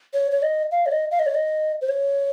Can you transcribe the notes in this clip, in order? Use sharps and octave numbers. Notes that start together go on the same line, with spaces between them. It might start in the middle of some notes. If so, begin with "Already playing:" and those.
C#5
C#5
D#5
F5
C#5
D#5
F5
D#5
C#5
D#5
C5
C#5